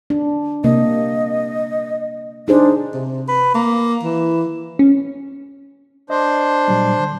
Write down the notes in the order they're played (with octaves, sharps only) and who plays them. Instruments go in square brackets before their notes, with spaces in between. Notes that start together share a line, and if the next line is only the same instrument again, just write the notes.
[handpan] D4
[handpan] C3 A#3 [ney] D#5
[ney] D4 [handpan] D#4 G#4 C5
[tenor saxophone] C3
B4
A#3
E3
[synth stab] C#4
[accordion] D4 C5 [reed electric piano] D#5
[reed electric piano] A#2 F#3 G3
D3